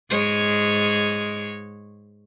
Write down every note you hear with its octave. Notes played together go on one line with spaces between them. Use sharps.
G#2 G#3 C#5